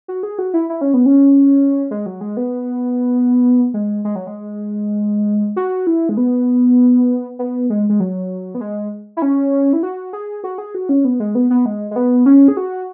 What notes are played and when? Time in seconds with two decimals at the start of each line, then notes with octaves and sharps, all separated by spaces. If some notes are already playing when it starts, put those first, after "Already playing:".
0.08 F#4
0.23 G#4
0.39 F#4
0.54 E4
0.70 E4
0.81 C#4
0.94 B3
1.06 C#4
1.91 G#3
2.06 F#3
2.21 G#3
2.37 B3
3.74 G#3
4.05 G#3
4.16 F#3
4.27 G#3
5.56 F#4
5.87 E4
6.09 G#3
6.17 B3
7.39 B3
7.70 G#3
7.89 G#3
8.00 F#3
8.55 B3
8.61 G#3
9.17 E4
9.22 C#4
9.73 E4
9.83 F#4
10.13 G#4
10.44 F#4
10.58 G#4
10.75 F#4
10.89 C#4
11.05 B3
11.20 G#3
11.35 B3
11.50 B3
11.66 G#3
11.91 G#3
11.96 B3
12.26 C#4
12.48 G#4
12.57 F#4